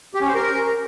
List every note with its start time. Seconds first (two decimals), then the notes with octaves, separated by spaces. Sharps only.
0.14 G4
0.21 C#4
0.28 C5
0.34 A#4